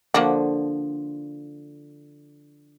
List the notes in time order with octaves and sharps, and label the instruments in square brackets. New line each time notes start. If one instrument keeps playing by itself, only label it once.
[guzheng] D3 F3 [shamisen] A#3 D4 F#4